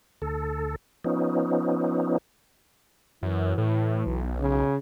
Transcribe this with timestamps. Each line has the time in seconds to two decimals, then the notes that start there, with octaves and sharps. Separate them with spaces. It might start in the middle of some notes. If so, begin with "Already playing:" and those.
0.22 D2 A4
1.04 F3 B3 C#4 D#4
3.23 F#2 E3
3.58 A2
4.07 B1
4.40 C#3